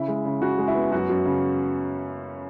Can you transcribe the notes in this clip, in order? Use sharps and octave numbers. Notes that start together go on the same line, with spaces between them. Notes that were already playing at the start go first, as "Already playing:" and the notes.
Already playing: C#3 E4
G#3
C#3
C#3 F#4
G#3
E4
B3
F#2 F#4
F#2
C#3